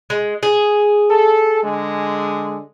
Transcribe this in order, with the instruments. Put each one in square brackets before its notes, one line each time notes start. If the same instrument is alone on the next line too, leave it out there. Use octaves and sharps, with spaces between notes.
[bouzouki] G#3
G#4
[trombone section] A4
D3 G#3